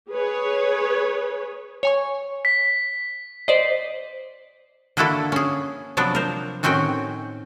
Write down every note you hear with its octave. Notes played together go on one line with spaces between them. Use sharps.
G#4 B4 C#5
C#5 G#5 C#6
B6
C5 D5 D#5 C7
D3 A#3 D4 E4 F#4 A4
C#4 G#4
C3 F3 F#3 B3 D4
A#4 C5
A2 D#3 C4 C#4 F#4 G5